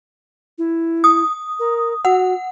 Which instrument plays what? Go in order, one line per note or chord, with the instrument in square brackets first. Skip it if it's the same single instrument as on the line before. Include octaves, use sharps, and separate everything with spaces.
[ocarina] E4
[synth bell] D#6
[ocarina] A#4
[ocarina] F#4 [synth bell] F#5